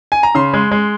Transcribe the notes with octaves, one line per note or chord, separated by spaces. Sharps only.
G#5
A#5
C#3 C6
G#3
G#3